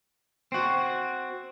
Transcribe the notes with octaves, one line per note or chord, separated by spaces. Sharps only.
C4 F#4